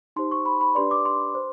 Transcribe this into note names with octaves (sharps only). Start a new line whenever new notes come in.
D#4 G4 C5 C6
C#6
B5
B5
D4 G4 B4 D5 C6
D6
C6
C5